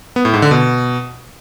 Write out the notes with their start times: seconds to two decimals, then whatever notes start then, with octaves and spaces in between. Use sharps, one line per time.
0.16 B3
0.25 A2
0.34 G#2
0.42 D3
0.51 B2